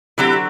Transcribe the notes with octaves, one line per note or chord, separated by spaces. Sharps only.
D3 F#3 C4 E4 F#4 G4